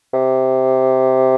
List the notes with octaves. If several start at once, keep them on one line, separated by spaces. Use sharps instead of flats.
C3